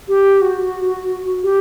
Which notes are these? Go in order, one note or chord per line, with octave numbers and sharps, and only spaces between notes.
G4
F#4
G4